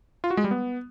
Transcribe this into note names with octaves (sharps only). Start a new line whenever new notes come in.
F4
F#4
G#3
G3
B3